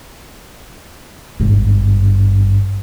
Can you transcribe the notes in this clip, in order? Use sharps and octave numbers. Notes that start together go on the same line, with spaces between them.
G#1 G2